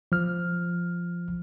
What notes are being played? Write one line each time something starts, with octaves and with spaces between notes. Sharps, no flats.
F3 F6